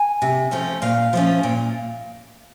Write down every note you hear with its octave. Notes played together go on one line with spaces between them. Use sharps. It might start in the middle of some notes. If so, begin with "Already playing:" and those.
Already playing: G#5
C3
F3 A3 C#4
A#2 F5
F3 A3 C#4
A#2